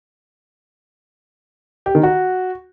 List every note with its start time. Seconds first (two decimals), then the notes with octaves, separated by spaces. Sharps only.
1.86 G4
1.95 D#3
2.03 F#4